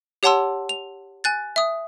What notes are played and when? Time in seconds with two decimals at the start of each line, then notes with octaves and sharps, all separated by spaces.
0.23 G4 C#5 F#5 A5 C6 E6
0.69 F7
1.24 G#5 F#6 A6
1.56 E5 D#6